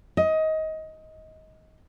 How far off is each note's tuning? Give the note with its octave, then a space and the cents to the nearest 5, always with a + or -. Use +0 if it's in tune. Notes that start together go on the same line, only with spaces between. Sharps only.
D#5 +20